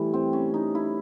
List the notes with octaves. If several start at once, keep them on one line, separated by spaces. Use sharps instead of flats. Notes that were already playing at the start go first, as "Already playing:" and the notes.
Already playing: A2 E3 G3
C4
C#4
D#4
E4